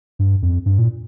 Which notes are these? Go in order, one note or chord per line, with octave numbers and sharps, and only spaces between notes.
G2
F2
G2
A#2